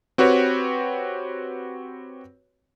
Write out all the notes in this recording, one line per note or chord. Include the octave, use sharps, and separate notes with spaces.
C4 F#4 G4 B4 C#5